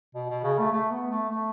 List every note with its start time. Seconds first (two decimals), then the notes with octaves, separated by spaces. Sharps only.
0.15 B2
0.30 B2
0.44 C#3
0.58 A3
0.72 A3
0.91 B3
1.11 A3
1.30 A3